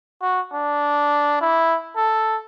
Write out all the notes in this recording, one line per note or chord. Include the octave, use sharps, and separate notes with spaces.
F#4
D4
E4
A4